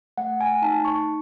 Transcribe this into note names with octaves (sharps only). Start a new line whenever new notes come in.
A3 F#5
G#5
D#4 A5
C#6